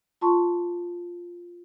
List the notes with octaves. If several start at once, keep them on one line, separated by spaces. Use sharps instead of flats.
F4 A5 C6 C#6